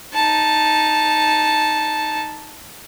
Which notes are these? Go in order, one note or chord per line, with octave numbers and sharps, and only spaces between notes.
D#4 A5